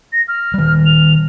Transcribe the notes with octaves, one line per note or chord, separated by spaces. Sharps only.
A#6
F6
D#3 G3
F7